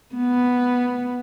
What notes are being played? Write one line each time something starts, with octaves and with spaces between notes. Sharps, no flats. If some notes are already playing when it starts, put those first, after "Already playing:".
B3